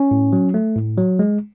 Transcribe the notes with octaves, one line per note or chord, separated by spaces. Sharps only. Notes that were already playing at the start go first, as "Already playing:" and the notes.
Already playing: C#4
A2
F#3
A3
A2
F#3
G#3